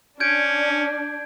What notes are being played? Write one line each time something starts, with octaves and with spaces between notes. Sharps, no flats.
C#4 D4 G6 G#6 D7